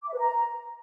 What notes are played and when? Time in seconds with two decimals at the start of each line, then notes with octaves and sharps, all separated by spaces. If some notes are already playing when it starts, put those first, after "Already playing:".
0.03 D6
0.08 E5
0.14 B4
0.19 A#5